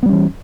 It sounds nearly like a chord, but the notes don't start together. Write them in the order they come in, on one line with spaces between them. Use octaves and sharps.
B3 G3 C#4 E3